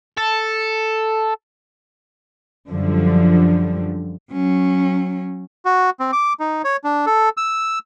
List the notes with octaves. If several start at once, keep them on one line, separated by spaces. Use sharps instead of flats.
A4
F#2 D3 F3 G3
F#3 C#4
F#4
C4
D6
D#4
C#5
D4
A4
E6